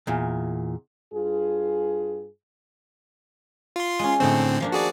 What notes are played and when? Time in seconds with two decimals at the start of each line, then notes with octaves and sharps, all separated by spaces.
0.07 E2 A#2
1.13 G2 F4 G#4
3.76 F4 C6
3.99 G#3 C#4
4.20 A2 D3 A3 C4 D#4
4.60 F3 A#3 D4
4.72 F#4 G#4 D5